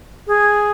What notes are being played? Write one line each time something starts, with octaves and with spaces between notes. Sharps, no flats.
G#4